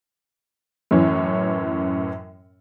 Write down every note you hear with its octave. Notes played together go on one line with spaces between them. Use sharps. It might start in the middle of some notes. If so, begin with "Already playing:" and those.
F#2 A2 E3 C#4